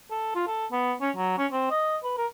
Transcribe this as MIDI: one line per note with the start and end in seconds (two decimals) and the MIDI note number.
0.11 0.34 69
0.35 0.43 65
0.47 0.67 69
0.72 0.94 59
1.01 1.11 61
1.16 1.38 54
1.38 1.47 61
1.52 1.70 60
1.71 1.97 75
2.04 2.15 71
2.18 2.26 70